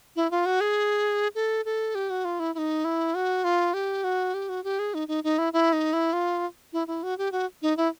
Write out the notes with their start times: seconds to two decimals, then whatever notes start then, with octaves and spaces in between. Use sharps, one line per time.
0.16 E4
0.31 F4
0.46 F#4
0.61 G#4
1.35 A4
1.65 A4
1.95 G4
2.10 F#4
2.25 F4
2.40 E4
2.55 E4
2.58 D#4
2.85 E4
3.15 F#4
3.44 F4
3.74 G4
4.04 F#4
4.34 G4
4.49 F#4
4.64 G4
4.79 G#4
4.94 D#4
5.08 D#4
5.24 D#4
5.38 E4
5.53 E4
5.73 D#4
5.93 E4
6.13 F4
6.73 E4
6.87 E4
7.03 F#4
7.18 G4
7.32 F#4
7.62 D#4
7.77 E4